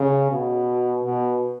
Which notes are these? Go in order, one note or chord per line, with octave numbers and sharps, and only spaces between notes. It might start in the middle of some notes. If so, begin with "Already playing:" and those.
Already playing: C#3
B2
B2